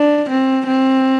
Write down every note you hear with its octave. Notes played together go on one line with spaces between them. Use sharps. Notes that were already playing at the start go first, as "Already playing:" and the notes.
Already playing: D4
C4
C4